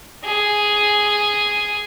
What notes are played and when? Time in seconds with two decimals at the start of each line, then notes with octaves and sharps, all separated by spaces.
0.24 G#4